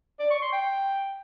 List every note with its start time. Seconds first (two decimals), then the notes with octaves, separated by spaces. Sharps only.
0.19 D5
0.30 C#6
0.41 C6
0.53 G5